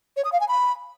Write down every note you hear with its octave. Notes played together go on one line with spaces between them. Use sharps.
C#5
D#6
F5
G#5
B5